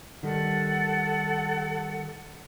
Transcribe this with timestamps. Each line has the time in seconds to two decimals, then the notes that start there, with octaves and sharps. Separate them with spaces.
0.23 D#3 G3 A4 F#5